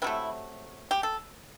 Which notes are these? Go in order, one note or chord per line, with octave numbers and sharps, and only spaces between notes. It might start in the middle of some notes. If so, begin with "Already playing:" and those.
C3 E3 F#3 A3 E4
G4
A4